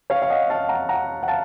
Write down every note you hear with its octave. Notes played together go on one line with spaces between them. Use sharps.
C#5 F5
F5
D#5 F#5
F5 A5
F#5 A#5
F#5 A#5
F#5
F5 A5